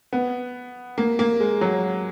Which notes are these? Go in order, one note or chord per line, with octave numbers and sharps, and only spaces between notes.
B3
A#3
A#3
G#3
F#3